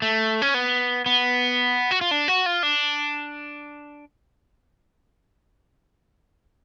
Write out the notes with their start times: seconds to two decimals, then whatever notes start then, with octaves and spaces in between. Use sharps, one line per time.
0.02 A3
0.42 C#4
0.54 B3
1.06 B3
1.91 F#4
2.01 F4
2.11 D4
2.28 F#4
2.46 F4
2.63 D4